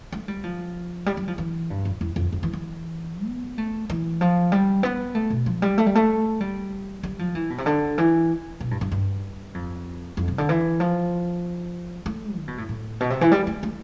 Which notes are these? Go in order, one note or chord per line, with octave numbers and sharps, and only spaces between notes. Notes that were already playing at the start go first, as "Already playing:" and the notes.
A3
G3
F3
G3
G3
F3
E3
G2
F2
E2
F2
F2
E3
E3
B3
A3
E3
F3
G3
B3
A3
B2
F3
G3
A3
G3
A3
G3
G3
F3
E3
B2
C3
D3
E3
B2
G2
G2
G2
F2
F2
C3
D3
E3
F3
A3
D3
B2
A2
A2
B2
C3
E3
G3
A3
A3